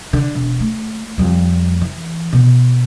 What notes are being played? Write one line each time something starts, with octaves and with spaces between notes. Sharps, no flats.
D3
E1
A3
F2 G3
E3
B2